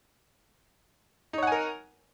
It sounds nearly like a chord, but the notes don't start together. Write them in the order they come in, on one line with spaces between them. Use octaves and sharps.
D#4 C#5 F#5 G#5 A#4